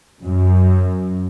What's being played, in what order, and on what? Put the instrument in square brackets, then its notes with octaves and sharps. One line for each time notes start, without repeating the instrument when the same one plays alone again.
[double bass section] F#2